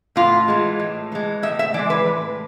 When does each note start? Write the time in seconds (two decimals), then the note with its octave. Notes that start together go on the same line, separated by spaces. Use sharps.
0.16 A2 F4
0.48 E3 G#3
0.80 A2
1.12 E3 G#3
1.43 A2 E5
1.59 E5
1.74 E3 D5
1.79 G#3
1.90 B4
2.06 A2